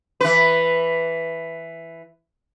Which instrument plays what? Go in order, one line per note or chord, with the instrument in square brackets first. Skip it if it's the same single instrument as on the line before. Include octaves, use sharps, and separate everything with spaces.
[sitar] E3 B4